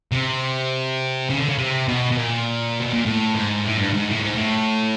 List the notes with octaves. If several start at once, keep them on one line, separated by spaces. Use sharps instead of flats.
C3
C#3
D3
C#3
C3
B2
B2
A#2
B2
A#2
A2
G#2
A2
G2
G#2
A2
G#2
A2